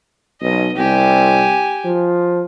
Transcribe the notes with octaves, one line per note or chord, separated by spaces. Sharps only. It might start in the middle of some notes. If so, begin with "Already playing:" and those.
B1 D#5
C2 G4 G#5
F3